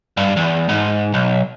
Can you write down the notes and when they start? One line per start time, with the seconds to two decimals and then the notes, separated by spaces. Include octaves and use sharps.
0.17 G2
0.37 E2
0.69 G#2
1.14 B1